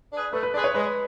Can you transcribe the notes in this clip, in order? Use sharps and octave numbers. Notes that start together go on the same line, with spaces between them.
D4 G#4 B4
A3 B4
B4
D4 G#4 B4 D5
C#5
G#3 B4